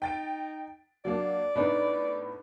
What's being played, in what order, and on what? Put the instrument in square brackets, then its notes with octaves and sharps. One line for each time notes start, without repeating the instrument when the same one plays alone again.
[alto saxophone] D#4 [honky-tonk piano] G5 A6 D7
[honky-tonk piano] F#3 A#3 D4 [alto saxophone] D5
[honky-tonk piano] A2 B3 [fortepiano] D4 D#4